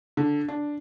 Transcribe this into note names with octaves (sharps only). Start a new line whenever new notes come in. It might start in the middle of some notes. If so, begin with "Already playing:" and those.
D3
D4